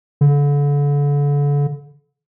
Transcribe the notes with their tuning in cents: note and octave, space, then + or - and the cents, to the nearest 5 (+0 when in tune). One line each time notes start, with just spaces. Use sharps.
D3 -35